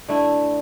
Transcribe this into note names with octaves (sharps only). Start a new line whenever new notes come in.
D3 A3 E4